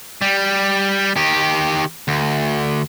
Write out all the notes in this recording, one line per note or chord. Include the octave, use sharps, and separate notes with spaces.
G3
D#3 G4
D2